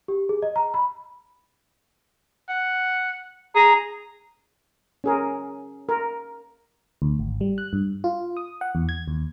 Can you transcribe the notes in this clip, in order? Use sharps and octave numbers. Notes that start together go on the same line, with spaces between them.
G4
G#4
D#5
A#5
B5
F#5
G#4 A#5
C#4 G#4 A#4
A#4
D2
G#1
G3
F#6
G2
F4
D#6
F#5
E2
G#6
D#2